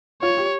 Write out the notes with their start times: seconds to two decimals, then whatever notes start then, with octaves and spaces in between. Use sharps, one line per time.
0.22 F4 C#5
0.37 G4